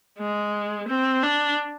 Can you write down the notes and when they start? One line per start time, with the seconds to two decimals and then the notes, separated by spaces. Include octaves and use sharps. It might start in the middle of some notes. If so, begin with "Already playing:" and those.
0.18 G#3
0.88 C4
1.22 D4